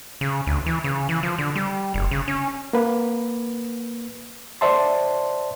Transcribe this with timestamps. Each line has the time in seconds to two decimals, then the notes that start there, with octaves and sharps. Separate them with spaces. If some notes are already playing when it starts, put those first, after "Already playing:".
0.21 C#3
0.47 D2
0.66 E3
0.84 C#3
1.09 E3
1.23 F3
1.38 D3
1.55 G3
1.94 F#1
2.11 C#3
2.28 C#4
2.73 A#3 B4
4.61 C5 D5 E5 A5 C6